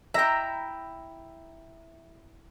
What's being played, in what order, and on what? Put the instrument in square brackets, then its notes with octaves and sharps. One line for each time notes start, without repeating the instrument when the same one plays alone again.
[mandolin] E4 A#5 [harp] E5 G5